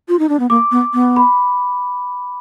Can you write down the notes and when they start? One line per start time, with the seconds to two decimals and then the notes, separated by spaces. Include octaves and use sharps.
0.08 F4
0.19 D#4
0.29 D4
0.40 B3
0.50 A#3 D6
0.71 B3
0.94 B3
1.16 B5